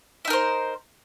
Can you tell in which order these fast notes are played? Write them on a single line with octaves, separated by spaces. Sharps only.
E4 D#4 A#4 C5